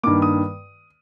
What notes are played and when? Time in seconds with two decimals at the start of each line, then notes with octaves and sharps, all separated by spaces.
0.03 G2 D#3 A#3 D6
0.22 D#6